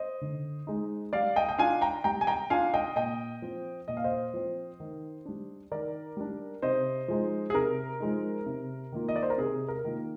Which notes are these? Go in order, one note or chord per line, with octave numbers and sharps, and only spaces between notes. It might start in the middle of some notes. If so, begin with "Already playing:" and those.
Already playing: C5 D#5
D3
G#3 D#4
G3 D5 F5
D#5 G5
G5
D4 F4 F5 G#5
G5 A#5
G3 G5 A#5
G#5
G5 A#5
D4 F4 F5 G#5
D#5 G5
A#2 D#5 G5
F3 C4
A#2 D#5
F5
C5 D#5
F3 C4
D#3
G3 D4
D#3 A#4 D5
G3 D4
C3 C5 D#5
F3 G#3 D#4
G#4
C3 A#4
F3 G#3 D#4
C3
D#3 A#3 F4
D#5
D5
C5
A#4
C3 G#4
A#4
D#3 A#3 F4